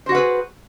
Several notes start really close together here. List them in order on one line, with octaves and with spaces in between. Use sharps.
C5 F#4 F#5 B4 G#4